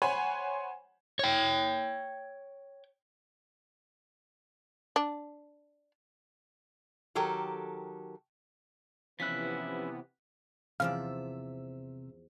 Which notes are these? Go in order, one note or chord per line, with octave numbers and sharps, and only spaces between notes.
C5 C#5 F#5 G#5 B5
C#5 G5
D4
D#3 F#3 G4 A4 A#4
C3 E3 F3 B3 C#4 E4 F#6 B6
E2 C3 F3 D5 E5 F5